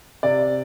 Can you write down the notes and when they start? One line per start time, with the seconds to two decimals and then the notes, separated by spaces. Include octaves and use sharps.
0.23 C3 D5